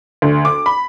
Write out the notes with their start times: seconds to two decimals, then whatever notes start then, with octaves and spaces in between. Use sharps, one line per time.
0.22 D2
0.45 D6
0.66 B5